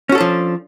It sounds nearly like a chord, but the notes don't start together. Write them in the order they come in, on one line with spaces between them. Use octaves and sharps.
C#4 F#4 A4 D4 F3